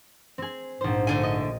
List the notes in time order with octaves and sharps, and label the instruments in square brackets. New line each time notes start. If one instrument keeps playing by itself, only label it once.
[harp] C4 G#4
[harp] A#1 C5 [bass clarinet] G#2
[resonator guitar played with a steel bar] A2 D3 G#5
[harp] D#5